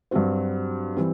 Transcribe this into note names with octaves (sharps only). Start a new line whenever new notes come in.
G2 F#3 C4 F#4 C5
E3 G3 C4